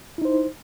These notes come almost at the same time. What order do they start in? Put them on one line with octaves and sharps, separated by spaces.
E4 D#4 C5